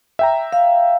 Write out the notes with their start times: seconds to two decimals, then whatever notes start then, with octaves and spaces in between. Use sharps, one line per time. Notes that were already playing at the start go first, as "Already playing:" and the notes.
0.19 E5 G5 A#5
0.53 F5